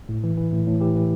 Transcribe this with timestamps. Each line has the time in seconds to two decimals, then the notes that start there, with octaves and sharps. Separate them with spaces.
0.09 A2
0.24 E3
0.37 E3
0.53 A2
0.67 A2
0.81 E3 G4
0.96 E3